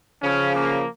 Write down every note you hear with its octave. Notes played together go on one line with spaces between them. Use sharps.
C#3 F3 C#4
A#3